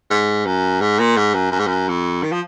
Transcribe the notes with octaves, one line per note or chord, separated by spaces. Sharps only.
G#2
F#2
G#2
A#2
G#2
F#2
F#2
G#2
F#2
F2
D#3
F3